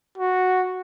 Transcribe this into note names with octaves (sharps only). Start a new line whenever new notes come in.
F#4